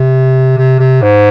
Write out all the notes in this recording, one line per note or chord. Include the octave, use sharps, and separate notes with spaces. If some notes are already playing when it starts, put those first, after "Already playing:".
Already playing: C3
C3
C3
G#2